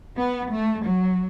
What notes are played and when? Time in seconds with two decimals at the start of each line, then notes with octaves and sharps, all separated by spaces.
0.17 B3
0.52 A3
0.85 F#3